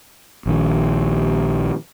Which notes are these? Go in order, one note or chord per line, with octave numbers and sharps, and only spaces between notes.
A#1 D#3